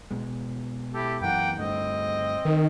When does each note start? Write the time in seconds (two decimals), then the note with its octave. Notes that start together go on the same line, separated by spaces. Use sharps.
0.11 B2 G#3
0.94 E4 G4 A4
1.22 F#2 E3 A#3 F#5 G5
1.58 D2 G2 A3 C4 D#5
2.45 D#3